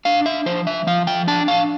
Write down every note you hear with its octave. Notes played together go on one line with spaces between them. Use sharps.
D4 F5
E5
F3 C5
E5
F3 F5
G5
D4 A5
F5